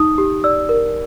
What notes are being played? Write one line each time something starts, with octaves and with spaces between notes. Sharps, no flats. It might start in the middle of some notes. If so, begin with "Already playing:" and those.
Already playing: D#4 D#6
G4
D5 E6
A#4